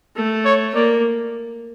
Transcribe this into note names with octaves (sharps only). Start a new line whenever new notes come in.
A3
C#5
A#3 D5